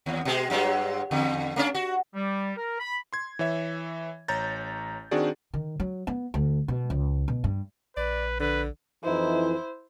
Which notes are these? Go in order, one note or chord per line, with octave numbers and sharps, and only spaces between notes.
D#2
B2 G#3
G2 F#3 G#3
E2 D3
A3 C#4 D4
F#4
G3
A#4
B5
C6 G#6
E3 C#5 E5
A1 C#5 A#5 G6 A6
D#3 C4 D4 F#4 G#4 D5
D#3
F#3
B3
D2
B2
C#2
B2
G2
A#1 B4 D5
D3 B4
F2 E3 D#4 E4 C5